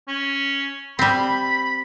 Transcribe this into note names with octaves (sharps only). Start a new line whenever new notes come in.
C#4
G3 C4 B5